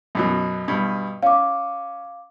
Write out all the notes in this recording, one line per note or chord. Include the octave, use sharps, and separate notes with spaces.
F#2 B2 F#3
G2 B2
C#4 F5 D6